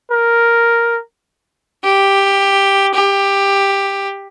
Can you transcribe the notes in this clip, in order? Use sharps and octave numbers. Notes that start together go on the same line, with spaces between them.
A#4
G4
G4